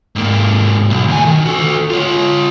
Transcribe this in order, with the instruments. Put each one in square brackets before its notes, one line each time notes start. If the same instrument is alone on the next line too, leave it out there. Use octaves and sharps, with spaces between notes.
[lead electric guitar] G#2 A#3
B1
D2 G#5
D#3
F#4 A4
F4 C#5